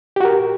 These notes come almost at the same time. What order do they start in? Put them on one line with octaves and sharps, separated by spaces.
G4 F#4 A#4